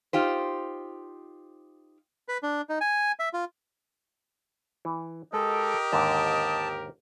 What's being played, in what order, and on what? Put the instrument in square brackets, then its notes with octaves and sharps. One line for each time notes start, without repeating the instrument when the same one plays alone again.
[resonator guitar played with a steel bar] D#4 F4 G4 C5
[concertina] B4
D4
D#4
G#5
E5
F4
[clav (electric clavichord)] E3
[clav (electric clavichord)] G#3 [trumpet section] G4 A#4 [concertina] A4 [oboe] D#5
[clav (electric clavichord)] D#2 G#2 D3 [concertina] A5